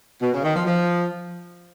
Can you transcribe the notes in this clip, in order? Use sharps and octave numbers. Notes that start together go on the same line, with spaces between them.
B2
C#3
D#3
F3
F3